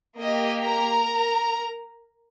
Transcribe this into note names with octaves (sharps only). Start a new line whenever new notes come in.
A#3 G4 D#5
A#4 A#5